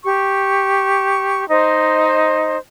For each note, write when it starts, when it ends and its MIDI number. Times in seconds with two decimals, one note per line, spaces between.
0.05 1.47 67
0.05 1.47 85
1.50 2.57 63
1.50 2.57 72
1.50 2.57 75